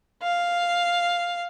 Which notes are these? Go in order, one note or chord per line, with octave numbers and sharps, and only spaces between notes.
F5